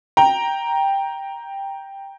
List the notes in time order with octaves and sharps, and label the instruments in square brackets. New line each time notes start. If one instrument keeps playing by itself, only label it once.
[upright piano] G5 A#5